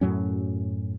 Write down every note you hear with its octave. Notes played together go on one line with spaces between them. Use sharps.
F#2 A2 F#3 C#4